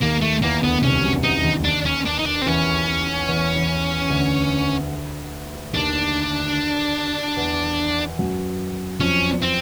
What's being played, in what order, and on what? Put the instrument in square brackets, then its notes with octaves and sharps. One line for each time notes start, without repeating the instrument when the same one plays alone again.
[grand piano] D#2 D#3 [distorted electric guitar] A#3
[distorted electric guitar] A3
[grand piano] E2 E3 [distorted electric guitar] A#3
[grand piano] D2 D3 [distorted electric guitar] B3
[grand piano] C2 C3 [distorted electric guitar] C#4
[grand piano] F#2 F#3
[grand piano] E2 E3 [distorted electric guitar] D#4
[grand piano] D#2 D#3
[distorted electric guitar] D4
C#4
D4
D#4
D4
C4
[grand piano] E2 E3 [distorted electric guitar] C#4
[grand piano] E2 E3
E2 E3
D2 D3
[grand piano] D#2 D#3 [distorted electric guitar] D4
[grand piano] E2 E3
F#2 F#3
[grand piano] F2 F3 [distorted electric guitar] C#4
[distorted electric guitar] C4